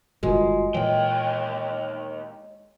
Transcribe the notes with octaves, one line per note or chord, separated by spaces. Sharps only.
F#1 G2 D#3 G#3 F4 F#4
D#2 A#2 E3 C#5 D#5 G5